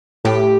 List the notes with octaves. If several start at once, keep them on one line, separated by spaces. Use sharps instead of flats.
A2 G4